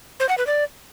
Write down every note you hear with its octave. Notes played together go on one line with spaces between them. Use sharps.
C5
F#5
B4
D5